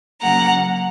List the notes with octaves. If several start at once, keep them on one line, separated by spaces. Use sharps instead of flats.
C#3 F#3 A#3 F#5 A#5